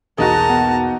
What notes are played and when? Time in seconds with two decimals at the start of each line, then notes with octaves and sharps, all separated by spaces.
0.18 B1 E2 A#3 D#4 F#4 G#4 A5 A#5
0.49 B3